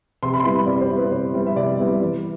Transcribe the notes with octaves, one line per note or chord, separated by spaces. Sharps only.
C3 C6
B5
C6
G3 B3 E4 B5
C3 D5
C5
G3 B3 E4
B4
C3 C5
G3 B3 E4
E5
C3 D5
G3 B3 E4
E3